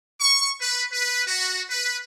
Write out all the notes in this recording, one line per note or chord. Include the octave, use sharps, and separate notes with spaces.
C#6
B4
B4
F#4
B4